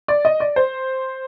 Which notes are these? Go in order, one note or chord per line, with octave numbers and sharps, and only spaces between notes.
D5
D#5
D5
C5